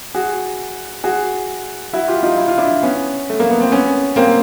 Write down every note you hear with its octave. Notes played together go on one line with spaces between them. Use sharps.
F#4 G#4
F#4 G#4
E4 F#4
F4 G4
D#4 F4
E4
F4
D4 E4
B3 C#4
A3
A#3
B3
C4
B3 C#4
A#3 C4